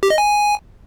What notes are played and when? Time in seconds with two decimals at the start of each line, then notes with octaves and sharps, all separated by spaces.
0.03 G4
0.10 D#5
0.18 G#5